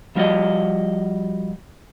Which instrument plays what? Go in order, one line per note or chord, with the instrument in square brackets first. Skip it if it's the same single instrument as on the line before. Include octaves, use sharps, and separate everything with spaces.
[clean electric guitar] F3 G3 F4 F#4 D5 D#5